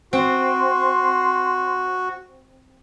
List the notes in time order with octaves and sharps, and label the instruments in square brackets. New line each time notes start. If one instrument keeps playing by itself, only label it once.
[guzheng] C4 [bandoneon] F#4 [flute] C6